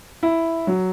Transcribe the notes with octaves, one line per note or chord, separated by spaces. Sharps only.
E4
F#3